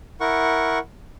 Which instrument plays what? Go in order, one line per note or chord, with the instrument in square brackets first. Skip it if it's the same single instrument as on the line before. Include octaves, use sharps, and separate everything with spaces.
[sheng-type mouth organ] E4 A#4 F#5 C#6